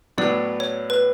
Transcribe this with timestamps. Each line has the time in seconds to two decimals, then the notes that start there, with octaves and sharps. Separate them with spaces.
0.18 A2 F#3 B3 D4 D5
0.60 C#5
0.90 B4